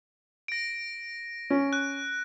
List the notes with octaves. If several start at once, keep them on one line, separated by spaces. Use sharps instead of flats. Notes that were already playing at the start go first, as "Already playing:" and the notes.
A#6 D7
C#4
F#6